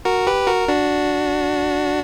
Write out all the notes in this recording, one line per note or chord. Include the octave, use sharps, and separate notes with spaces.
F#4 A#4
G4 B4
F#4 A#4
D4 F#4